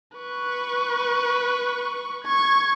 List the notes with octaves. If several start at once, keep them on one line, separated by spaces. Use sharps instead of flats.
B4 C#6
C#6 G#6